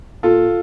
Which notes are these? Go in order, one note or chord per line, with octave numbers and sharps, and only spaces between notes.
A#2 F4 A4